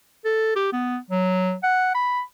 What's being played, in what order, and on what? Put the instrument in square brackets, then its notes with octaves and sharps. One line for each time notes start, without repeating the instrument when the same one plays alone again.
[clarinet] A4
G4
B3
F#3
F#5
B5